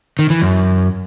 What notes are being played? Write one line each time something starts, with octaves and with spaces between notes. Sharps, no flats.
D#3
E3
F#2